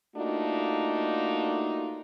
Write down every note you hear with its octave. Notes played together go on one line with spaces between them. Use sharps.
A3 A#3 D4 D#4 F4 F#4